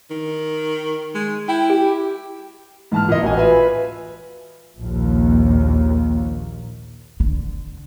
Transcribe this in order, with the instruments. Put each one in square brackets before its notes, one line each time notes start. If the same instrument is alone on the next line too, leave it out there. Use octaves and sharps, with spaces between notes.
[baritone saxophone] D#3
G#3
[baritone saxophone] E4 [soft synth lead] G5
[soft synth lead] G4
[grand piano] G#2 A5 F6 [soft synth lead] E3
[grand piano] A#2 D#5
A1 F#4 G#5
[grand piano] F4 E5 G#5 [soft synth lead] B4
[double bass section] A#1 D#2
[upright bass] D3